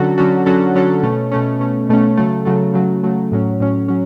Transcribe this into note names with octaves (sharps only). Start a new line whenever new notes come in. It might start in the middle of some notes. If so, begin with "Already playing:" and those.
Already playing: D3 F#3 C#4 F#4 A4
D3 F#3 C#4 F#4 A4
D3 F#3 C#4 F#4 A4
D3 F#3 C#4 F#4 A4
B2 A3 C#4
B2 A3 C#4
B2 A3 C#4
B2 A3 C#4
C#3 F#3 A3
C#3 F#3 A3
C#3 F#3 A3
C#3 F#3 A3
A2 F#3 C#4
A2 F#3 C#4
F#3 C#4